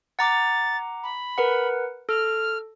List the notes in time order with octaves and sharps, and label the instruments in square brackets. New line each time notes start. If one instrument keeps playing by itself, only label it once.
[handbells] F#5 A#5 D6 [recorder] A6
[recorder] B5
[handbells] A#4 B4 F#5
[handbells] A4 [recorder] F6